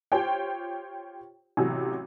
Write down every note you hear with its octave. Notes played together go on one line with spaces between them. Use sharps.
F4 G4 C5 C#5 G5
A1 C3 F#3